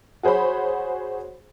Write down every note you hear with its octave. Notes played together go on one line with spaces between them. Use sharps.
F#4 G#4 C5 C#5 B5